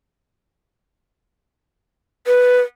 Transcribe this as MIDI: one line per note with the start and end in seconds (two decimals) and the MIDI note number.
2.27 2.61 71